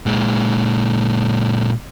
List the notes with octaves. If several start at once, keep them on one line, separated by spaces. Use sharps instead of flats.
A#2 G#3